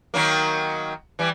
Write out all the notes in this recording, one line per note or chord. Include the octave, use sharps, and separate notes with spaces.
D#3 F#3 A#3
E3 G3